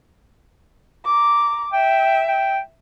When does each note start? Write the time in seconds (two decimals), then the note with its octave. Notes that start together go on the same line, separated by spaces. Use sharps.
1.05 A#5 D6
1.73 E5 G5
2.28 G5